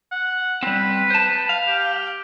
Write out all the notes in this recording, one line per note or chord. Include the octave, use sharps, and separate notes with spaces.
F#5
G3 C4 B4
C5 A5
F5
G4